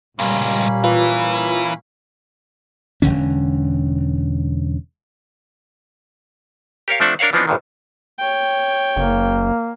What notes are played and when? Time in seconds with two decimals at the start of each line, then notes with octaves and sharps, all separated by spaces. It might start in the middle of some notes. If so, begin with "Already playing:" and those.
0.19 C#2 G2 A#2 G3 A#3 C#4 B5
0.84 E3 F4 B4
3.02 E1 B1 D3 C#4
6.88 G4 A#4 C#5 F5
7.00 F3 A3 C4 D4 E5 F#5
7.19 D4 A#4 C#5 F5 F#5
7.33 E3 F3 B3 C4 D4 D#4
7.47 A1 G2 D3 D#3
8.19 C#5 G5
8.96 F#1 A#3